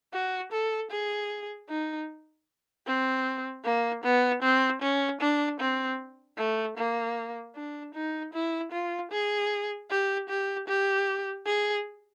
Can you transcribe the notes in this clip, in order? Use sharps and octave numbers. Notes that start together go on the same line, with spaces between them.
F#4
A4
G#4
D#4
C4
A#3
B3
C4
C#4
D4
C4
A3
A#3
D4
D#4
E4
F4
G#4
G4
G4
G4
G#4